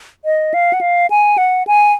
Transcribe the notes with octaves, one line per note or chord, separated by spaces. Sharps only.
D#5
F5
F#5
F5
G#5
F#5
G#5